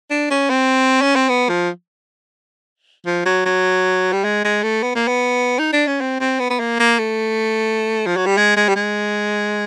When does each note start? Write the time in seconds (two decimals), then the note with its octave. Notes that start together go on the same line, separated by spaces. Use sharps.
0.10 D4
0.31 C#4
0.50 C4
1.02 C#4
1.15 C4
1.29 B3
1.49 F3
3.06 F3
3.26 F#3
3.45 F#3
4.12 G3
4.24 G#3
4.44 G#3
4.63 A3
4.83 B3
4.95 A#3
5.07 B3
5.59 D#4
5.73 D4
5.87 C#4
6.01 C4
6.20 C4
6.39 B3
6.50 B3
6.60 A#3
6.80 A#3
6.99 A3
8.06 F3
8.17 F#3
8.26 G3
8.37 G#3
8.57 G#3
8.68 G3
8.75 G#3